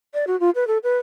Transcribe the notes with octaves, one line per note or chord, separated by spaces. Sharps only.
D5
F#4
F4
B4
A4
B4